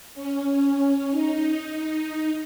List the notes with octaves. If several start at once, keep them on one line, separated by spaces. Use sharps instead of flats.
C#4
D#4